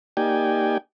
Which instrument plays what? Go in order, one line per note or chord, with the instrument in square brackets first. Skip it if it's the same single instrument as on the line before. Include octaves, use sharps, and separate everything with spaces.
[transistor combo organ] A#3 D#4 G4 D5 G5 G#5